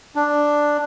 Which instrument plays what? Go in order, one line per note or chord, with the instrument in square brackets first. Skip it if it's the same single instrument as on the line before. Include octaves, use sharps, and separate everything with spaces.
[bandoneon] D4